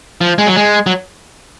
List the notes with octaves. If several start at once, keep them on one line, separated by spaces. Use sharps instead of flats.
F3
G#3
F#3
G#3
F#3